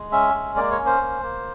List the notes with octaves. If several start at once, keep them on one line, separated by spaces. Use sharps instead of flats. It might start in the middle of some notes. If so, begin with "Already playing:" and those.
Already playing: G#3
C#4 E5
G#3
A#3 D5
C#5
C#4
C5
A#3
A#3